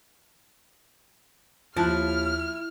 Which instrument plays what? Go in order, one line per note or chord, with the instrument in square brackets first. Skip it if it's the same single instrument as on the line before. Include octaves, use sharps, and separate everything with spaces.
[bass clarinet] D#2 [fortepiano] F3 A5 F#6 [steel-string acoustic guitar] E4 [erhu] F6